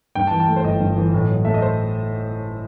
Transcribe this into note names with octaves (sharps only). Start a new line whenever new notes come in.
G2 G5
A5
E3
A5
A3
C5
G1 D#5
G2
E3
A2
F#3
A3 E5
D#5
C5